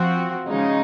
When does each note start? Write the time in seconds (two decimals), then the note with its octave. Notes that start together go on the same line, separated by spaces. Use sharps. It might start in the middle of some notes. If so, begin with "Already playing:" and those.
Already playing: F3 C4 F#4
0.47 C#3 G#3 D#4